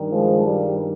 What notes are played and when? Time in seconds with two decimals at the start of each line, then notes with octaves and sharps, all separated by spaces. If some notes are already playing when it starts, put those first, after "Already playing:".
Already playing: G2 D#3
0.09 F3 G#3
0.45 G3